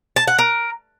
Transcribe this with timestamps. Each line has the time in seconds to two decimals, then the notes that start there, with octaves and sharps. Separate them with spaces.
0.16 A5
0.27 F#5
0.39 A#4